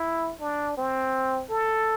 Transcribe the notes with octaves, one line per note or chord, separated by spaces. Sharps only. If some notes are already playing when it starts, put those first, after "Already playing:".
Already playing: E4
D4
C4
A4